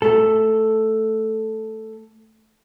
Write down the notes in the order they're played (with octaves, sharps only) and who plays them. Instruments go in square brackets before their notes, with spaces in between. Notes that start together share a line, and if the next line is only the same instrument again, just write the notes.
[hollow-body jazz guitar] A3 A4